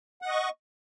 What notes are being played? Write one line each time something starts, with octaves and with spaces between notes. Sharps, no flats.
D#5 F#5 C#6